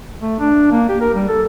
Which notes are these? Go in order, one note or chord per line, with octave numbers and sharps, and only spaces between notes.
A3
D4
A#3
G4
A#4
G3
A4